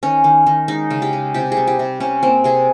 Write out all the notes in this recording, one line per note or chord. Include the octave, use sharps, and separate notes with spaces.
D#3 C#4
D#3
D#3
G#3 D#4
C#3
G4
G#3
C3 G4
G3 G#4
G4
C3
C3 C#4
A#3 C4
C3 G#4